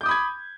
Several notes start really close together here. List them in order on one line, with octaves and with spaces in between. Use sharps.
G6 D6 D#6 B5 G#6